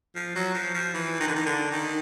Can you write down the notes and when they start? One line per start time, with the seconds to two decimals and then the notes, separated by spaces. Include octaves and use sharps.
0.16 F3
0.35 F#3
0.54 F3
0.74 F3
0.94 E3
1.20 D#3
1.28 D3
1.35 D#3
1.46 D3
1.72 D#3